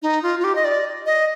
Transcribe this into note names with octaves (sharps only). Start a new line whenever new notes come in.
D#4
F4
F4
G4
D#5
D5
D#5